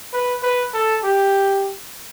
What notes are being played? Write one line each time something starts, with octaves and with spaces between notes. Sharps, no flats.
B4
B4
A4
G4